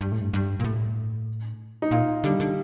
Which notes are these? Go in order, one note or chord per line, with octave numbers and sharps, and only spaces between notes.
G2
A2
G2
G2
A#2
A2
D#4
A#2 F4
D3 G3
D3